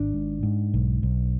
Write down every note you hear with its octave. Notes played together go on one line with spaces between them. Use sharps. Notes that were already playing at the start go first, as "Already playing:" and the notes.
Already playing: G#1 D4
G#2
G#2
B1
B1